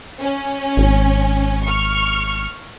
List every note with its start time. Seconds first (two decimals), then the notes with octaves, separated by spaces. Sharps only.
0.22 C#4
0.77 G#1
1.66 C#6 F6